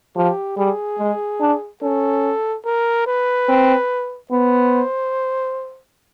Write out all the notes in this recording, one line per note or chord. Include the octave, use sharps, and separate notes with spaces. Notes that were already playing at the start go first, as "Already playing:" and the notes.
F3 G4
G3 G#4
G#3
D4
C#4 A4
A#4
B4
C4
B3 C5